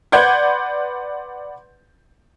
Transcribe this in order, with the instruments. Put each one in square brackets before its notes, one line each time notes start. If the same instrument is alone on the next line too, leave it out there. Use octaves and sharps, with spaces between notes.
[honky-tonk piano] B4 D5 F#5 C6 G6 G#6